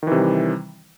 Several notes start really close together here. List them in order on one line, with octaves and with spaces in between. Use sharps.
D#3 E3 C3 G3